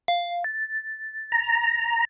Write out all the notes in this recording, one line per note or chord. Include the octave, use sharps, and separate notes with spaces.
F5
A6
A#5